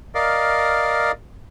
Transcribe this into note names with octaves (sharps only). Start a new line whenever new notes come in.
A#4 D5 D#5 F5